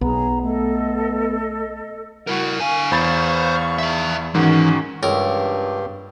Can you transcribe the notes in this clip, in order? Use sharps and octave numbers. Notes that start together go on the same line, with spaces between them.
B1 B3 G#4 A#5
A3 A4 D#5
E4 F#4 A#4
D3 F5 G#5 C#6
E2 C5 C#5 B5 A6
G#4 E5
G#2 D#3 E3 C#4 F#4
C#2 G2 A#4